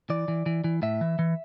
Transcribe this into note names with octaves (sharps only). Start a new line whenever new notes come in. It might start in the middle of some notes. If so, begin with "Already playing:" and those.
E3 D5
E3
E3
E3
A2 E5
E3
E3